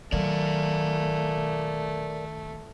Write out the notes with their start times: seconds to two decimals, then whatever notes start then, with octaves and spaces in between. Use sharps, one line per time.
0.12 D#3 F#3 A3 A#4 D5